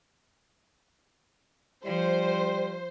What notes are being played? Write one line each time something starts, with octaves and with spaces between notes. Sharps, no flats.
F3 G3 C5